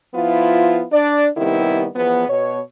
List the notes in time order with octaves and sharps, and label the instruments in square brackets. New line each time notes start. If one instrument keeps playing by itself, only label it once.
[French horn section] F3 B3 E4 F4
D4 D5
C3 D#3 G3 B3 E4
E2 F3 B3
B2 C#5